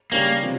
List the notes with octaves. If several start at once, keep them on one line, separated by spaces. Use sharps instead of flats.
C#3 G3 A#3 C#4 G4 C#5
C3 F3